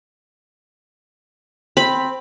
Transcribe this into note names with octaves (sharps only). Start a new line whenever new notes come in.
C4 B5